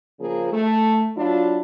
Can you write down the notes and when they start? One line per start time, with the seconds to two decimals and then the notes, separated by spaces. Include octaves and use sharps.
0.19 C#3 F3 A#3 G#4
0.52 A3
1.16 F#3 D4 E4 F4